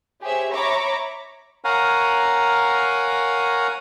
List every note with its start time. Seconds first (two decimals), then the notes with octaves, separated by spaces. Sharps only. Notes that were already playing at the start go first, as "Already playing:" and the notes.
0.21 G4 G#4 C5 C#5 E5
0.53 C#5 E5 A#5 B5 C#6 D6
1.65 A#4 C#5 F5 F#5 G#5 A#5